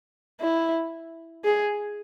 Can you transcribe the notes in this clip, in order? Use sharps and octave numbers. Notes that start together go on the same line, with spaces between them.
E4
G#4